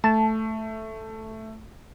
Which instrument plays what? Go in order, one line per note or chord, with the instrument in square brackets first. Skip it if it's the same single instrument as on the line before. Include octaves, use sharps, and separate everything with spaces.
[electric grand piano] A3 [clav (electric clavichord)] A5